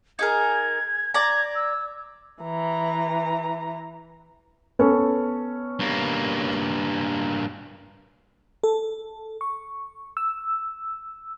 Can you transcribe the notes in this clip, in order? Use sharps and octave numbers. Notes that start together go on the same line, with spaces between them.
D#4 G#4 A#4 G#6
D5 A#5 G#6
E6
E3 A#5
B3 C#4 A4
G2 A#3
A4
C#6
E6